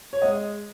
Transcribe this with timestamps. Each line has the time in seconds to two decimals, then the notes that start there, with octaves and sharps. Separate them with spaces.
0.13 C#5
0.22 G#3 D#5